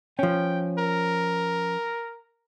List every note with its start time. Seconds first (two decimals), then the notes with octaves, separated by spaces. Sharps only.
0.19 F3 C#4 G5
0.78 A#4